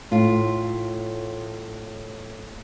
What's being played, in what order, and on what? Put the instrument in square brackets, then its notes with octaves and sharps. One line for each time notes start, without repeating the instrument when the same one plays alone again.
[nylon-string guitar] A2 F4